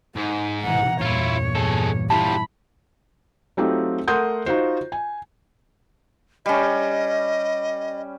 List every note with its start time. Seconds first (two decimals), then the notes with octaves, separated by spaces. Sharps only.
0.16 G#2 D#4
0.62 C2 B2 E3 F#5 A#5
1.01 E2 G2 A#2 E4 F4 C#5
1.55 G#3 A4
2.10 G3 E4 F4 A5 B5
3.57 F#3 A3 C4 D#4 F4 G4
4.08 A3 A#4 F#5 C6 D#6 G6
4.46 D#4 F4 F#4 C5
4.92 G#5
6.46 G3 C#4 D#5